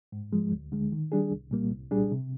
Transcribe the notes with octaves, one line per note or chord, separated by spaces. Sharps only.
G#2
F3 G#3
D2
D3 G#3
D#3
G3 D4 G#4
C2
A#2 G3 A#3
C2
A#2 G3 D4 G#4
C3